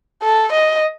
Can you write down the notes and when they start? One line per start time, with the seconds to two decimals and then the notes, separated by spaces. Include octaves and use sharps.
0.23 A4
0.52 D#5